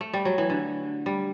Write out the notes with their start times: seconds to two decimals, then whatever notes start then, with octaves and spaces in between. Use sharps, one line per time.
0.01 A3
0.13 G3
0.25 F#3
0.38 E3
0.50 D3
1.06 G3